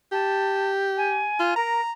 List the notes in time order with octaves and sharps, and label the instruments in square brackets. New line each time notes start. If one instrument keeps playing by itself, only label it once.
[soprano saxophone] G4 [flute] A5
[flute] G#5
[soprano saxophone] F4
[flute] A#4 [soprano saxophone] A#5